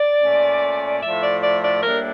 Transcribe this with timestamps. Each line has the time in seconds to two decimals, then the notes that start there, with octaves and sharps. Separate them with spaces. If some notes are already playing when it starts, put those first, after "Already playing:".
Already playing: D5
0.22 A#2 A3 C#4
1.03 A2 F3 A3 E5
1.23 D5
1.43 D5
1.63 D5
1.83 A2 G3 A#3 D4 A#4